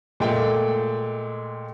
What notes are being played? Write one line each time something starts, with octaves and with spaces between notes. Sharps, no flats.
A#2 G#3 A3 G5